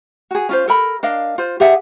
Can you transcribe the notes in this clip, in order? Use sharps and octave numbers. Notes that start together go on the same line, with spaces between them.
F#4 G#4
C#4 F4 C5
A4 A#4 B5
D4 A#4 D#5 F5
F4 C5
G4 G#4 E5 F#5